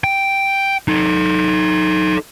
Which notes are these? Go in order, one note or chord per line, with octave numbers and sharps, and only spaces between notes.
G5
D#4 A4